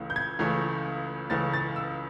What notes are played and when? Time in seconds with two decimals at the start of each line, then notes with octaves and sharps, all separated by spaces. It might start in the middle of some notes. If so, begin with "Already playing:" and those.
Already playing: C#2 C#3 E3 A3
0.10 G6
0.16 G#6
0.39 C#2 C#3 E3 A3
1.30 C#2 C#3 E3 A3 A6
1.53 A6
1.76 E6